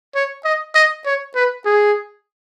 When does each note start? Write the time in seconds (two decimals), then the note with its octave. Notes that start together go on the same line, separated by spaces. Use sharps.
0.15 C#5
0.45 D#5
0.75 D#5
1.06 C#5
1.35 B4
1.66 G#4